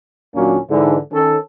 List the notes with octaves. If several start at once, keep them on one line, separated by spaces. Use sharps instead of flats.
D#2 A#2 F#3 A#3 C#4 D4
G#2 D3 E3
D#3 C#4 A4